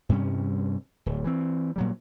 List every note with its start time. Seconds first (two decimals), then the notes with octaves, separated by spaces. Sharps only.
0.09 G2 C3 G3 C#4
1.06 D1
1.24 E3 C4
1.76 A#2 F#3 G3